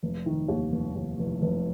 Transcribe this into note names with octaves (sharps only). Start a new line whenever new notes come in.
F1
D#3
D#2
F1
D#2
F1
F1